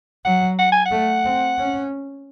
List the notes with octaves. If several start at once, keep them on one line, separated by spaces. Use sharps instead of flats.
F#3 F#5
F#5
G#5
F#5
A3
C4
C#4